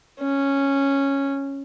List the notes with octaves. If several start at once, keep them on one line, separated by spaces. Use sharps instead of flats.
C#4